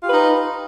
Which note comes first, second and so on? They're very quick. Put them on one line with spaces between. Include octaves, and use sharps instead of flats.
F4 G4 B4 D#4